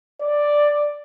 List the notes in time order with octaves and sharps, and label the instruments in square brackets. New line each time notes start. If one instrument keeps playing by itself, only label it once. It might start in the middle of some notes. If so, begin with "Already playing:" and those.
[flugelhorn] D5